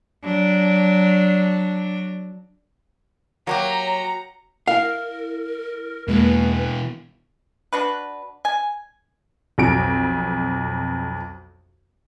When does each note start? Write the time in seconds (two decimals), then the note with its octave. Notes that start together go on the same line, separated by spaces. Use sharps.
0.24 F#3 D4
3.47 F#3 A#3 F#4 G4 A#5
4.68 E4 A#4 F5
6.08 E2 B2 E3 G#3 A#3 B4
7.73 D4 F#4 B4
8.45 G#5
9.58 B1 F2 D7